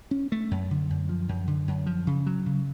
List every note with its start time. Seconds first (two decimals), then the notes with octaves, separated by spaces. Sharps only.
0.11 C#4
0.32 A3
0.51 F#2
0.71 D3
0.90 F#2
1.09 F3
1.29 F#2
1.47 D3
1.68 F#2
1.86 F3
2.07 C#3
2.26 F#3
2.46 C#3